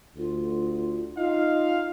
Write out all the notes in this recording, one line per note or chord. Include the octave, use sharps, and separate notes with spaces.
D2 F4
D#4 F4 F5